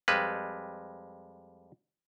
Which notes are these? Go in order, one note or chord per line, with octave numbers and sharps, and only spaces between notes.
F2 G3 G#3 B4